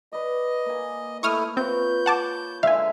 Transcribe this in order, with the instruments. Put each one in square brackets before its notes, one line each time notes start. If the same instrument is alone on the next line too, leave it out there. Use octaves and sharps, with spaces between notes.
[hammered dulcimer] B4 D5 [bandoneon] D#5
[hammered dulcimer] A#3 G#5
[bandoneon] A3 E4 [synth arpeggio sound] C#6 D#6 F6
[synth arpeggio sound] C4 [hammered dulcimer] F4 B4 C#5 [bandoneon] G6
[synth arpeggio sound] F#5 A5 D6
[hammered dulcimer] D3 D#3 G#3 [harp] E5 [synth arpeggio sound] F5 G#5